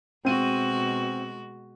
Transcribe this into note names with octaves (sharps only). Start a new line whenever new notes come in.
B2 G#3 C4 F#4 D#7